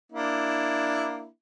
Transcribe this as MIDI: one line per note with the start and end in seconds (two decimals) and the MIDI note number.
0.12 1.27 58
0.12 1.27 62
0.12 1.27 64